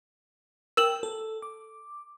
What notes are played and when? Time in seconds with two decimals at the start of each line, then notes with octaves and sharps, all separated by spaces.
0.77 A#4 G5 E6 E7 F#7
1.03 A4
1.42 D6